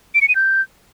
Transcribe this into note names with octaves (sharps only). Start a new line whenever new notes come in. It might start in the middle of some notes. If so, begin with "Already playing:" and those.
D7
C#7
D#7
G6